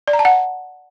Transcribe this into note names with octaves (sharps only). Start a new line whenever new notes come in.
D5
A#5
A5
F#5